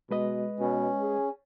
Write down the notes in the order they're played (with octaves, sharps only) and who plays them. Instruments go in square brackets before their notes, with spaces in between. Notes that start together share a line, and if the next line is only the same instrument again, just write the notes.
[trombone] B2 [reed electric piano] G#3 B4 D#5
[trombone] B2 [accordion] C#4
[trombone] G#4